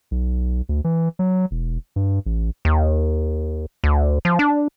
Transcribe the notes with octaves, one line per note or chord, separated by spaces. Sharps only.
B1
D2
E3
F#3
E1
G2
A1
D#2
D2
F3
D4